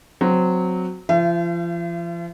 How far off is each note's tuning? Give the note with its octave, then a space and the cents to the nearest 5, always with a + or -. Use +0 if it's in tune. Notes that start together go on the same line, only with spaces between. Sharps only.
F#3 -10 C4 -15
F3 -35 E5 +45